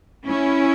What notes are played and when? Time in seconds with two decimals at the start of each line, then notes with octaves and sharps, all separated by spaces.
0.27 C#4 E4